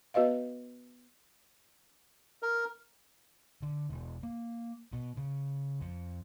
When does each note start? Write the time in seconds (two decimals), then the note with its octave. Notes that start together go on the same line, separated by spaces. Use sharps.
0.14 B3 F#4 B4 D#5 F5
2.42 A#4
3.62 D3
3.89 E1
4.23 A#3
4.93 B2
5.17 C#3
5.81 F2